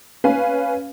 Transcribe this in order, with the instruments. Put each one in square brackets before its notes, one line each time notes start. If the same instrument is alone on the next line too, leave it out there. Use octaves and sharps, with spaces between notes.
[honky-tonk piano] C#4 B4 F5 G#5